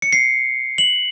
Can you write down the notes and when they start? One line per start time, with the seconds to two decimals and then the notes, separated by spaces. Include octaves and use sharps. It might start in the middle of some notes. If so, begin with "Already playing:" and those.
0.02 C#7
0.13 C7
0.78 F#7